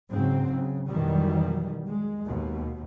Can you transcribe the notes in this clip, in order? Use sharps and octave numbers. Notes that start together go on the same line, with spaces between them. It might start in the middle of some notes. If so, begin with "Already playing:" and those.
G#2 C#3 F#3 C4
C#3
F2 B2 D#3 E3 F#3 G3
G#3
D#2 B2